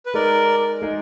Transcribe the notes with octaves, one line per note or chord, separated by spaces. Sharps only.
B4
G#3 D#4 G#4 A#4 D5 D#5
G#3 D#4 G#4 D#5